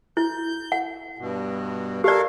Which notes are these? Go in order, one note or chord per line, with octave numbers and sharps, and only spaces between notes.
E4 G6
F#5
G2 B2
G4 A4 A#4 D5 F5